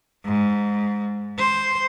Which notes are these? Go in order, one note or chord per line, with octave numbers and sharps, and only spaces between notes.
G#2
C5